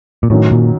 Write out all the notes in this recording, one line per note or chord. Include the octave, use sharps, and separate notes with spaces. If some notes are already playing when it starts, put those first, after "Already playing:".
A#2
F#2 A2 D#3 F#3
A#2